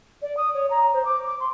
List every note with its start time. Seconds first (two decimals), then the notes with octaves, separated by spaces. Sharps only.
0.22 D5
0.37 D#6
0.54 C#5
0.70 A#5
0.93 C5
1.05 D6
1.27 D6
1.40 C6